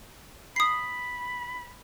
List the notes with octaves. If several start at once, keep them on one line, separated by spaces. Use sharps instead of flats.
B5 D#6 C7